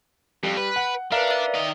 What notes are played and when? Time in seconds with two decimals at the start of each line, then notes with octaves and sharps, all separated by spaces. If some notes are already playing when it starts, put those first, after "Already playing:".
0.43 F2 G3
0.57 B4
0.76 F#5
1.12 D4 A#4 B4 E5 F5
1.28 D5 E5
1.54 D#3 D#5